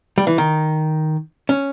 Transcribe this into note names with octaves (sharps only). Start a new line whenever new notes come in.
G3
E3
D#3
C#4